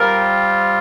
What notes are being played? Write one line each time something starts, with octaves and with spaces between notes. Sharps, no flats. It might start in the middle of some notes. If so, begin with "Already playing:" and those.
Already playing: G3 C4 F4 A#4